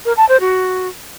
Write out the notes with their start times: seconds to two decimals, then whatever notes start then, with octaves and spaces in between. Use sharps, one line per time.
0.05 A#4
0.17 A5
0.29 C5
0.40 F#4